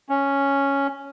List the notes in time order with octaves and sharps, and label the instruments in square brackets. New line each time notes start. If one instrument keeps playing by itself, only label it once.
[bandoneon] C#4